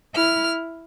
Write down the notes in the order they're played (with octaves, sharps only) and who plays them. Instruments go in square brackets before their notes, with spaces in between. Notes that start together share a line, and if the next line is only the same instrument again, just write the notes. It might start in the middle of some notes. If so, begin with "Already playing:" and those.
[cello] E4 [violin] F6